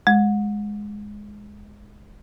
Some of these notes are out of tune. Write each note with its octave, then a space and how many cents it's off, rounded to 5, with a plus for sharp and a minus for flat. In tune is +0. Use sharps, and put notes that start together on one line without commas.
G#3 +0